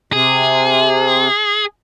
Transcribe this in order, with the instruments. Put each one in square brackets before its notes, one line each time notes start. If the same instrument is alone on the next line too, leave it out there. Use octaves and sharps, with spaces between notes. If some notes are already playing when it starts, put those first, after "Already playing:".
[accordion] C3 [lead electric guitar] G#4